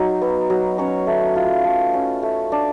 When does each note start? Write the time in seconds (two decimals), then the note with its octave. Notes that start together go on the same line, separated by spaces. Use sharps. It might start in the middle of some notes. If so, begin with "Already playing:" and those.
Already playing: F#3 D#4
0.22 B3
0.50 F#3
0.78 C#4 C#5
1.07 A3
1.36 F4
1.65 A3
1.93 C#4
2.23 A3
2.52 D4